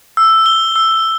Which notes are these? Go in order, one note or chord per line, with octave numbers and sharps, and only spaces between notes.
E6
G7
E6